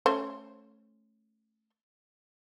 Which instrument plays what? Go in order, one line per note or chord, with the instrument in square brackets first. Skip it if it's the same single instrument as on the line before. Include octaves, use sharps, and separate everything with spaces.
[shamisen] A3 C#4 C5